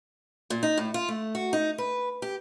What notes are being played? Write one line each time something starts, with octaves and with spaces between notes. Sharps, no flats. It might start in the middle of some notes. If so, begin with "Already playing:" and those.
A#2
D#4
A2
F4
A3
F#4
D#4
B4
G4